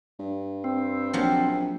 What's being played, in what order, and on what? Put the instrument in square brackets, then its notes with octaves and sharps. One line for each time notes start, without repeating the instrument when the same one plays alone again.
[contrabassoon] G2
[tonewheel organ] C4
[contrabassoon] A#1 [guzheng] F3 F#3 G4